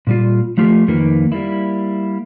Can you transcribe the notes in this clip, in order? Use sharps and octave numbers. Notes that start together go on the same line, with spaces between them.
A#2 G3 F4
F3 A3 F4 G4 A#4
F2 D#3 A#3 D#4 A#4 B4
G3 A#3 E4